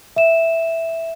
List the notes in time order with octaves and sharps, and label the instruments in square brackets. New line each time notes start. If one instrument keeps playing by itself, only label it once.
[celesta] E5 E7